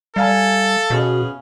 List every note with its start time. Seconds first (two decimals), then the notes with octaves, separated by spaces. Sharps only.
0.16 G3 A4 E5 F5 G#5
0.90 B2 B3 C#4 G#4